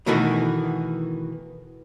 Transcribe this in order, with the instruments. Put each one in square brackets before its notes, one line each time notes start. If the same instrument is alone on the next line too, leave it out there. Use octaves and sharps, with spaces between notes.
[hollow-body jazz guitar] B2 D#3 E3 A3 B3 F#4